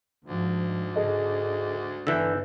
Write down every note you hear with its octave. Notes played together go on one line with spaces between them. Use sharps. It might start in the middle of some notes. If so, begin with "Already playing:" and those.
D2 G#2 F3
G#2 D3 G#4 A4 D#5
G1 D3 E3 E6 F#6 G6